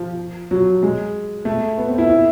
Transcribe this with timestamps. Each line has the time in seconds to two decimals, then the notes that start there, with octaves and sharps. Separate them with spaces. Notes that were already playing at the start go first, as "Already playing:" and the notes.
Already playing: F3
0.51 F#3
0.83 G#3
1.45 A3
1.78 B3
1.88 C4
1.98 E4
2.10 E4